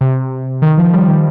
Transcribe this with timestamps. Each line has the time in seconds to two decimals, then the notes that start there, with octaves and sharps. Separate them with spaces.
0.01 C3
0.62 D#3
0.77 F3
0.93 G3
1.08 D#3